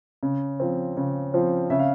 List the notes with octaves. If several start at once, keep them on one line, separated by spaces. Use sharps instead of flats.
C#3
F3 C4
C#3
F3 C4
C#3 E5
F5